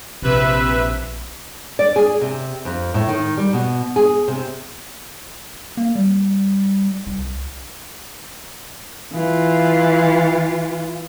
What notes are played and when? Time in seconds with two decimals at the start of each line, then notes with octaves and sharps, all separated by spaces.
0.22 A#1 C3 B4 E5
1.79 D5
1.96 G#4
2.21 C3
2.65 F2
2.94 A2
3.09 D#3
3.37 G3
3.53 B2
3.96 G#4
4.28 C3
5.77 A#3
5.95 G3
7.07 C2
9.13 E3 F4